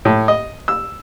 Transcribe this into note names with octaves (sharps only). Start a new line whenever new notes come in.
A2
D#5
E6